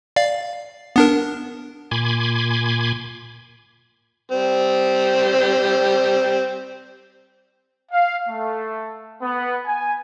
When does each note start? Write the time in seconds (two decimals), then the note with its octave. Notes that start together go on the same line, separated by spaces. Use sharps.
0.16 D5 F5
0.96 B3 D4 A#4
1.91 A#2 G#5 B5 C6 D6 G#6
4.32 G3 C4
7.91 F5
8.29 A3
9.22 B3
9.66 G#5